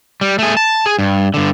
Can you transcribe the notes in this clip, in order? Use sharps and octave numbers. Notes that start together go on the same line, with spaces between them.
G3
A3 G#4
A5
G#4
G2
G2 D3